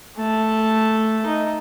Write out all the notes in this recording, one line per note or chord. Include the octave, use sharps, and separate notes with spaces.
A3 A5
D#4